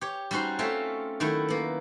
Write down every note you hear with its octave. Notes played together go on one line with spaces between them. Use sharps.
G4 C#5
G3 C#4 D#4 F#4 C5 C6
A3 C4 C#4 F4 C#5 E5
D#3 F#3 A3 E4
A#3 B3